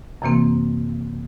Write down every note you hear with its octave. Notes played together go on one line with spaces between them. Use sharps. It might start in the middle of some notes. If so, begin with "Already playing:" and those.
F#2 C3 E3 A#3 C4